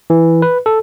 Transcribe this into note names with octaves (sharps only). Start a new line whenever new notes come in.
E3
B4
A4